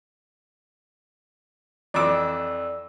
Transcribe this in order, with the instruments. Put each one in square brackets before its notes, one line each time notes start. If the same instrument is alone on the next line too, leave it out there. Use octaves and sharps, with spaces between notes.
[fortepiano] F2 E3 D6 [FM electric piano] D5 E6